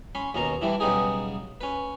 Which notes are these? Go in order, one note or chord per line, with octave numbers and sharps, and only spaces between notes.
C#4 B5 C6
D#2 B2 C#4 A#5 C6
E3 G3 D4 E4
B1 C#3 G3 B3 D#4 G#4
C#4 B4